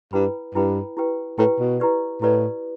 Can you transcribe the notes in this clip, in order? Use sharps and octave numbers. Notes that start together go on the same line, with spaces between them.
G2 E4 B4 G5 B5
G2 E4 B4 G5 B5
E4 G4 B4 G5
A2 E4 G4 B4 G5
B2
E4 G4 B4 D5
A2 E4 G4 B4 D5